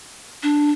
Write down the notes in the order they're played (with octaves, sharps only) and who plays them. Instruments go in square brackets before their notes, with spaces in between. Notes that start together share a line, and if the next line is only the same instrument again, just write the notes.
[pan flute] D4